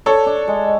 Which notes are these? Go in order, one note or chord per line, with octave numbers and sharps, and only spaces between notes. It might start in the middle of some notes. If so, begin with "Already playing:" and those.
D4 A4 C#5
D4
G#3